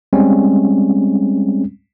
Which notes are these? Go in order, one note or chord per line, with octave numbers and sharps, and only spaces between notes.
G3 G#3 C4 C#4